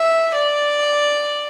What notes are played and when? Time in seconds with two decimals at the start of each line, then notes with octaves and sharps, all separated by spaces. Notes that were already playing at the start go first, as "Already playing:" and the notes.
Already playing: E5
0.35 D5